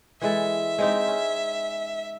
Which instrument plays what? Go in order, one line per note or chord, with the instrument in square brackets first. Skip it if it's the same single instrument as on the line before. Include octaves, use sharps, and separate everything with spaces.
[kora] E3 G#3 A4 [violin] E5
[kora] G#3 C4 D#4
C#4